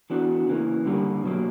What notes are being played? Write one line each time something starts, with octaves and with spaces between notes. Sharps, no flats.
E3 B3 D4 F#4
C#3 E3 A#3
G2 D3 G3 A#3
B2 F#3 A#3